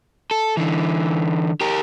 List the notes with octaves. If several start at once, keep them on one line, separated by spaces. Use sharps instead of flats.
A4
D3 E3
G4 A#4